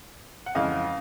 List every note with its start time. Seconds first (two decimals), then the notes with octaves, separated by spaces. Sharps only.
0.46 F#5
0.55 F2 C#3 E3 G#3 D#5 F5